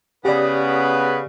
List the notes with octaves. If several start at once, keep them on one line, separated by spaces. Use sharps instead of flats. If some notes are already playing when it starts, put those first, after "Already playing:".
C#3 B3 G4 B4 D5